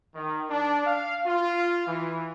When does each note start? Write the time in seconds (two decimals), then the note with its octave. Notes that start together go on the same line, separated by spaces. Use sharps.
0.15 D#3
0.50 D4
0.86 F5
1.26 F4
1.87 E3